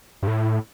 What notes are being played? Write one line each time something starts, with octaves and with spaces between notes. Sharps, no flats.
G2
A2